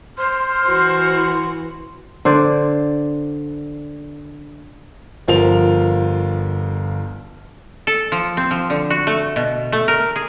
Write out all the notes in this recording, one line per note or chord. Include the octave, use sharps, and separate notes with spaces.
C5 C6 F6
E3 F#4
C6
D3 C5 D5
G1 F3 F4 A#4 F7
A4
F3
C4
F3
D3
F#4
A3
B2
A3
A#4
G#4